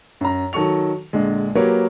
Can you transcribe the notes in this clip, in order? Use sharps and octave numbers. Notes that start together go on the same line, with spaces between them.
F#2 A#5
D#3 F#3 A4 C#6 F7
A#1 D3 G#3
F#3 A#3 G4 A#4 B4 C#5